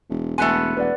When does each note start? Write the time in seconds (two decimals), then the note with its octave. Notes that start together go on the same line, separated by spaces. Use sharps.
0.09 E1
0.38 E1 A3 B3 G#5 C6 F#6 C#7
0.77 E1 B4 D5 F#5